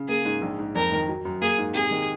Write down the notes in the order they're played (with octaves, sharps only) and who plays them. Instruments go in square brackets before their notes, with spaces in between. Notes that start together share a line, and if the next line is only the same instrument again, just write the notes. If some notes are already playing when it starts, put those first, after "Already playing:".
Already playing: [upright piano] C#3
[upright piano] A#3 [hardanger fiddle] G#4
[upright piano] G#2
A#1
G#2
[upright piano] F2 [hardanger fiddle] A#4
[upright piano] D#3
F#3
F#2
[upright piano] A#3 [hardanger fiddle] G#4
[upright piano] G#2
[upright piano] C3 [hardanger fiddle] G#4
[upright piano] D#3